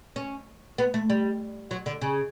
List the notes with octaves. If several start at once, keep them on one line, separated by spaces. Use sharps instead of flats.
C#4
B3
A3
G3
F#3
D3
C#3